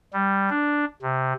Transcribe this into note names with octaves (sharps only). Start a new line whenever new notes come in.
G3
D4
C3